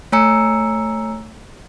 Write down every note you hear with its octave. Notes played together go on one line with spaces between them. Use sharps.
A3 C#5 G#5 A#5 E6 C#7